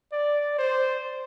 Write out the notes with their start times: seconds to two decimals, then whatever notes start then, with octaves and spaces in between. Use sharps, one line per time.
0.12 D5
0.59 C5